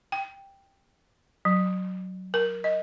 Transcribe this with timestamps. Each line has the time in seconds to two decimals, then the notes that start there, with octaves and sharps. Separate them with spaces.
0.12 G5
1.45 F#3
2.34 A#4
2.64 D#5